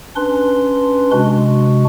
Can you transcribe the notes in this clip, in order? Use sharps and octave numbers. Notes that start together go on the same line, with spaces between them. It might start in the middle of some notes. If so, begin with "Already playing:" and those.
C#4 D4 B4 C6
C3 G#3 D4 F#4